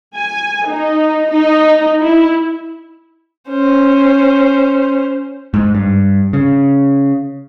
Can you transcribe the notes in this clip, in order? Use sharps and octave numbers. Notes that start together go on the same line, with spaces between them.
G#5
D#4
D#4
E4
C#4 C5
G#2
G2
C#3